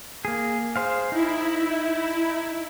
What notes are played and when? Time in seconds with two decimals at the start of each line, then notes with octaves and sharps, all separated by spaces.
0.25 A#3 G#4
0.76 G#4 C5 F5
1.12 D#4 E4